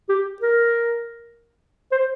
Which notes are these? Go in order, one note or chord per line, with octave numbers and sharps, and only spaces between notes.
G4
A#4
C5